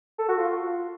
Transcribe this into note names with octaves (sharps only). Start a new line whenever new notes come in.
A4
F#4
F4